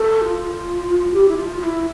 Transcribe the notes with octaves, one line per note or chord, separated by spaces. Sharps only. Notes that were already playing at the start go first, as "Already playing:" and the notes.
Already playing: A4
F4
G4
E4
F4
F4
E4